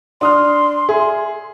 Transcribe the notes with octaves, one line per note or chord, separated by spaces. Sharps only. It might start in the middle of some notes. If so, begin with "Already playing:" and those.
D4 C6 D#6 F6
G#4 E5